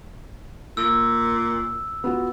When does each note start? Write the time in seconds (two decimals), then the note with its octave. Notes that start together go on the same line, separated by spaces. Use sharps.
0.77 A#2 E6
2.04 B3 F4 F#4